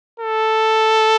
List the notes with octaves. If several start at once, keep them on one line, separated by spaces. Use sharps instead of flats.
A4